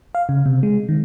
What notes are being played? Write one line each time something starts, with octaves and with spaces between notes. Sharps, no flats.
F5
C#3
C3
G#3
D#3